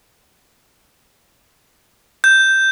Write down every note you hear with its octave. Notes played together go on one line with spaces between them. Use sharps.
G6